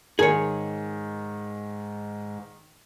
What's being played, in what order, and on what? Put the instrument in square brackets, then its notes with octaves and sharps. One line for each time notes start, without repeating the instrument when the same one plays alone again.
[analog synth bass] G#2 [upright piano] D#3 [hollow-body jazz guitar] G#4 C#5